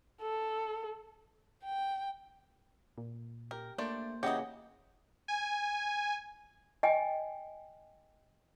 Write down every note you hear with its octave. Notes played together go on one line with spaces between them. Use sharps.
A4
G5
A#2
G4 A#4 G5
A3 A#3 D4 C5 D5
C#3 E3 D#4 F#4 G4 D#5
G#5
D#5 G5 G#5